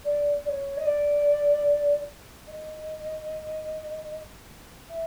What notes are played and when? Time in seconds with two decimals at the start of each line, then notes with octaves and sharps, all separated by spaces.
0.04 D5
0.45 D5
0.48 C#5
0.77 D#5
0.85 D5
2.47 D#5
4.89 E5